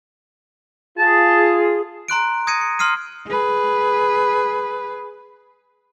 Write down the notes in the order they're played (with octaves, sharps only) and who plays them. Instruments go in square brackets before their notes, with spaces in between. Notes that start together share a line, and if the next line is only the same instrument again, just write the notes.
[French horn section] F4 [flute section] G#4 [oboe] A5
[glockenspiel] A#5 C6 F#6 D7
D#6 G#6 A#6 C#7 D#7
C#7
C6 D#6 F6 C7 D#7
[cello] G#4 B4